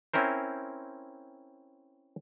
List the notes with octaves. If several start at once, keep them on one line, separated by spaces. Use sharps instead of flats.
C4 C#4 E4 A#4 C5